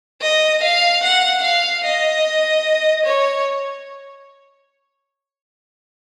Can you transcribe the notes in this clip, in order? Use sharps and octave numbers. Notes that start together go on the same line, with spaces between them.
D#5
F5
F#5
F5
D#5
C#5